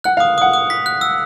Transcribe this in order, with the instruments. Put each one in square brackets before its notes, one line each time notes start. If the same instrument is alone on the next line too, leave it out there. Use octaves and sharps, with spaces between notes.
[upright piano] F#5 [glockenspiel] F#6
[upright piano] F5
[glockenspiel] D#6
[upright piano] F#5 [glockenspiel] D#6
[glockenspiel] D#6
B6
F#6
E6